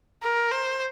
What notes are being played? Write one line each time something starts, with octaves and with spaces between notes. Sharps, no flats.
A#4
C5